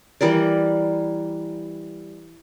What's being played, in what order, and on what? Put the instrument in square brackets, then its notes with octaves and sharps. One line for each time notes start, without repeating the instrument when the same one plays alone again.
[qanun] E3 G3 A#4 D5